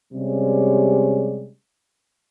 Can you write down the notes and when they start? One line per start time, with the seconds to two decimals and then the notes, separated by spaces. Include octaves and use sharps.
0.13 C3 G3 G#3 C#4